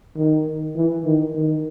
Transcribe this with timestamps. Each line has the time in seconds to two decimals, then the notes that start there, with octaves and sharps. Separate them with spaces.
0.17 D#3
0.76 E3
1.05 D#3
1.35 D#3